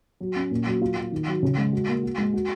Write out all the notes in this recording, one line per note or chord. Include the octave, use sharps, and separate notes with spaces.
F#3
C#4
A#2
F#3
F4
F#3
D#3
F#3
C#3
G#3
F#4
A#3
F#4
G#3
F#4